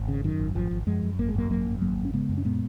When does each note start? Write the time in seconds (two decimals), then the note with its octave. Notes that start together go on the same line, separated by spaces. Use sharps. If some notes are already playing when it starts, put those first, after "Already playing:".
Already playing: G#1
0.08 C#3
0.24 F#2 D#3
0.40 G#1
0.55 G#1 F3
0.71 G#1
0.87 F#2 F3 G#3
1.03 F#2
1.19 G#1 A#3
1.28 G#3
1.35 F#2 F#3 A#3
1.50 G#1 F#3 A#3
1.66 F#2
1.81 G#1 F#3 A#3
1.98 F#2
2.05 C#4
2.13 C#3 G#3 B3
2.29 F#2
2.38 C#4
2.45 A#2 G#3 B3